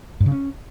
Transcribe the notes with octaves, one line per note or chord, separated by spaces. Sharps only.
G2
C#3
C#4